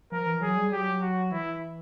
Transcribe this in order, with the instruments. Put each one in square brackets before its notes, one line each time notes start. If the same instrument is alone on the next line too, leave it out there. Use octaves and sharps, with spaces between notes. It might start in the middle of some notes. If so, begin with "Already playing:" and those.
[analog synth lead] F3 [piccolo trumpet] A#4
[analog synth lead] E3
[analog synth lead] F#3 [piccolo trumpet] G#4
[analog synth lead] G3
[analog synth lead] F#3 [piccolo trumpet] G4
[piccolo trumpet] F#4
[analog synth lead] E3 [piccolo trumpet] E4